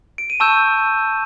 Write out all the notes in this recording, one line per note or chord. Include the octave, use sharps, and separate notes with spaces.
D7
D#7
A5 C#6 E6 G6 E7